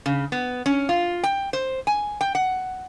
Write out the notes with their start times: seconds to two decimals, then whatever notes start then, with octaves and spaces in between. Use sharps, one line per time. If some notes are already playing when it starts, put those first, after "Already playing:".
0.06 C#3
0.32 B3
0.66 C#4
0.89 F4
1.23 G5
1.53 C5
1.87 G#5
2.21 G5
2.35 F#5